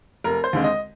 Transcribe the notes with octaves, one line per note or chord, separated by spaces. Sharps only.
F1 A#4
C5
D#2 D3 G#3 C4
D#5